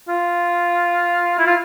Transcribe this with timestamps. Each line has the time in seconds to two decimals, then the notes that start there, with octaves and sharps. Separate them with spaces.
0.09 F4
1.39 E4
1.47 F4